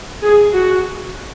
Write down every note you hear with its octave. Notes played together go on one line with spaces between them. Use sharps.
G#4
F#4